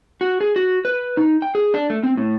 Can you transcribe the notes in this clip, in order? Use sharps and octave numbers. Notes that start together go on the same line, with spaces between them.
F#4
G#4
F#4
B4
D#4
G5
G#4
D4
A3
C4
A2